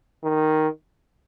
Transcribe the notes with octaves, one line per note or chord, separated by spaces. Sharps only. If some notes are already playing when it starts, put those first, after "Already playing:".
D#3